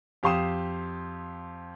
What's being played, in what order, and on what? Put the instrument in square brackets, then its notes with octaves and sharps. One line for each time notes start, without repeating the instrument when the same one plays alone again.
[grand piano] F2 G4 F5 C6 D#6 E7